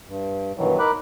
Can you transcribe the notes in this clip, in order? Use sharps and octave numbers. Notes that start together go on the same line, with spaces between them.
G2
G2 B2 D#3 E3 F#3
D#4 A#4 B5 D6 F#6